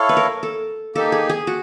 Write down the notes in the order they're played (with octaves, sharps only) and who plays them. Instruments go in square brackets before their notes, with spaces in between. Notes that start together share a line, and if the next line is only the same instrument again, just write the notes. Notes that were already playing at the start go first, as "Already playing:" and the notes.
Already playing: [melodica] E4 A4 C#5 F5
[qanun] B4
A#4
A4
[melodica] A#3 D#4 G4 [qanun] A4
[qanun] G#4
G#4
F#4